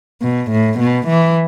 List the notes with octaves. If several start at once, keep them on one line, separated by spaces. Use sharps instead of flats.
B2
A2
B2
E3